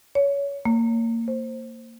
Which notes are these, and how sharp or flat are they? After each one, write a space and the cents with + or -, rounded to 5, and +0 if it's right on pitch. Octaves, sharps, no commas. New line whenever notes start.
C#5 +20
A#3 -25
C5 +15